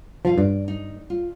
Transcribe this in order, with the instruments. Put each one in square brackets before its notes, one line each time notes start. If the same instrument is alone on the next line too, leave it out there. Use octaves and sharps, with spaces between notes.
[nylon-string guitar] B2 F4 F5 [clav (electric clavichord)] F3
[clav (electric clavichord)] G2 [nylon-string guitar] D5
[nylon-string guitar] D#4
F4